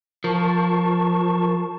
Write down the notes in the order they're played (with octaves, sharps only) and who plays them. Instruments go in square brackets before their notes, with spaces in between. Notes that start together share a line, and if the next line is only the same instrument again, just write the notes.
[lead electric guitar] F3 [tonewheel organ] A#4 A5 C#6